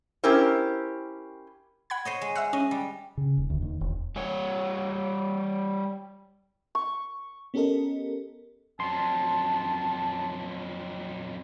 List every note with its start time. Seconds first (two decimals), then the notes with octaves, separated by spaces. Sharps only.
0.24 C#4 E4 G4 A#4 C5
1.90 F#5 B5 G#6
2.05 C5 C#5 D#5
2.21 G#3
2.35 E5 F#5 E6 F#6
2.53 C#4 D#5
2.71 G3
3.17 C#3
3.37 D#1
3.50 D2
3.62 D#2
3.81 E1
4.16 G3 C#5
6.75 C#6
7.54 B3 C#4 G4 A4 A#4 D#5
8.80 F2 F#3 A5 C6